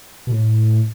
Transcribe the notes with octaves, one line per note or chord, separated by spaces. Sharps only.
B2
A2